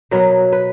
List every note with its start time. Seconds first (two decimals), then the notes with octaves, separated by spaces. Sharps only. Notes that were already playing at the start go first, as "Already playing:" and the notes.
0.11 B2 F#3 B3 A#4
0.52 B4